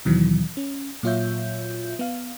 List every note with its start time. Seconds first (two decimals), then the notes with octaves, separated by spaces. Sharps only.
0.05 D#2 B2 D#3 E3 F#3
0.57 C#4
1.03 A#2 F#3 F4 C#5 E5 G6
1.99 B3 F5